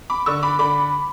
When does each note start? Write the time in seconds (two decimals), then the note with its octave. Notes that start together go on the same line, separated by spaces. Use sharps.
0.10 B5 D6
0.26 D3 C#6 E6
0.43 B5 D6
0.59 D3 B5 D6